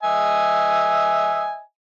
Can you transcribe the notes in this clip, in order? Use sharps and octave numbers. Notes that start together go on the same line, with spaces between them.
D#5 E5 G#5